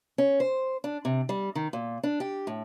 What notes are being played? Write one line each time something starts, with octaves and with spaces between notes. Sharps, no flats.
C#4
C5
D4
C3
G3
D#3
A#2
D4
G4
A2